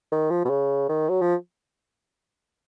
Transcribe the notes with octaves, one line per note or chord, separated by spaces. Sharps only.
D#3
F3
B2
C#3
D#3
F#3
F3